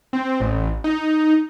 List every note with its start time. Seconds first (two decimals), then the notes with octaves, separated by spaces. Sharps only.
0.13 C4
0.40 A1
0.84 D#4